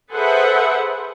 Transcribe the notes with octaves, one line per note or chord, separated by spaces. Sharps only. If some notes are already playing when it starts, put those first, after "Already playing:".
G#4 A4 B4 C5 E5 F#5